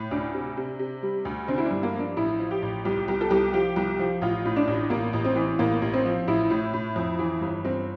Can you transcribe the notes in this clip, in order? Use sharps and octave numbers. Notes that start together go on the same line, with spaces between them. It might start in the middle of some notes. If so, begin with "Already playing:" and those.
Already playing: A2
D2 D4
C3
C3
C3
G3
D2
D3 C4
E4
D4
G2
A#3
F3
D4
A1 E4
F3
G4
A1
C2 G4
C2 G4
A4
C2 G4
F3 G4
C2
F3
A1 F4
A2
D4
A1
A1 A#3
A1
C4
E3
A1 A#3
A1
C4
F3
A1 E4
A2
A2
F2
E3
G1
G1 C4